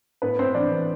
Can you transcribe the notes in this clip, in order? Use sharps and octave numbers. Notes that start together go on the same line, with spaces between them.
A2 B3 B4
A2 C4 C5
E3 D4 D5
E3